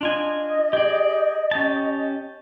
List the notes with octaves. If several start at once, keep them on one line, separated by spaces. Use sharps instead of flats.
D4 F4 D#5 G#5
G4 G#4 D5
C#4 G4 A5